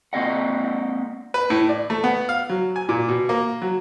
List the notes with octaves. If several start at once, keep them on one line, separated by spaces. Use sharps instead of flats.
A#3 C4 D#5 F#5
B4
A2
D5
A3
B3
F5
F#3
G#5
A#2
B2
A#3
F#3